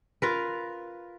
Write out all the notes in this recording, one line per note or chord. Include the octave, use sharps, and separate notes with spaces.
F4 A#4 B4